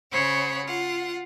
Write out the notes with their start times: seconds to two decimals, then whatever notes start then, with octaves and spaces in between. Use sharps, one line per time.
0.11 C#3 C5 C#5 F#5 B5
0.65 F4 F#5